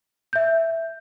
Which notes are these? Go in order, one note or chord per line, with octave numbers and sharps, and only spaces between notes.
E5 G6